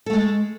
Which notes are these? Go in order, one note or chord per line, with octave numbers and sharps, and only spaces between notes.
G#3 A3 A4